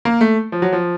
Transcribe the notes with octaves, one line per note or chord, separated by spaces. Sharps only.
A#3
A3
F3
F#3
F3